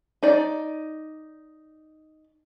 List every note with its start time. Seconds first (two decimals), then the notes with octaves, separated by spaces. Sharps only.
0.23 D#4 D5